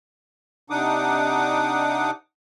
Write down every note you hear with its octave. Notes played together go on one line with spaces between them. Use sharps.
C3 D4 D#4 F#5 D6 D#6